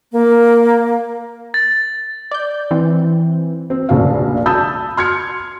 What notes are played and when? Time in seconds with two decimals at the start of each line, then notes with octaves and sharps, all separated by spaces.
0.12 A#3
1.54 A6
2.31 D5 G6
2.71 E3 C4
3.70 C4
3.89 F1 A#1 C#3 D4 F#4 F5
4.46 A5 B5 D#6 E6 G6
4.97 C6 F6 G#6 C#7